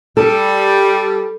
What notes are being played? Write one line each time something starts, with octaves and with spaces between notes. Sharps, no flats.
G3 A4